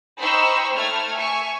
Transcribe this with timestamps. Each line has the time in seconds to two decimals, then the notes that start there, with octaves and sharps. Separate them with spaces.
0.20 D#4 C5 G5 B5 C#6 E6
0.75 A3 F6 G#6
1.14 E5 G#5 C#6